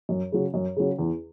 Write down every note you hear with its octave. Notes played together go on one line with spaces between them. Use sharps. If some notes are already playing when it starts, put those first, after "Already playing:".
F#2
C#3 F#3
F#2
C#3 F#3
E2